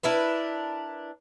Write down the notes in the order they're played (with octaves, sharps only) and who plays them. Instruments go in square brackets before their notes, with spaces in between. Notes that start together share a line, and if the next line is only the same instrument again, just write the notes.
[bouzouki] D4 E4 A#4 B4